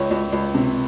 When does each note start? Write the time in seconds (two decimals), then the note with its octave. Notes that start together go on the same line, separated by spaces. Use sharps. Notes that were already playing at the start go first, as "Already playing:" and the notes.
Already playing: C#2 C#5
0.11 C#2
0.32 C#2
0.54 C3